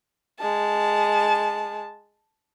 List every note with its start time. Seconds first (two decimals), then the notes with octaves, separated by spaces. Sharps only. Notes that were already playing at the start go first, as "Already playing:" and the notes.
0.40 G#3 A5